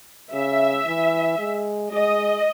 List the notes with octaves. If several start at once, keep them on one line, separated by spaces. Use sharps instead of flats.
C#3 E5
E3
G#3
G#3 D#5